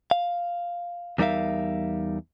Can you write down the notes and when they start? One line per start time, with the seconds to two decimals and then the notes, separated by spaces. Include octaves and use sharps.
0.11 F5
1.18 E2 G3 D#4 A#4 E5 F5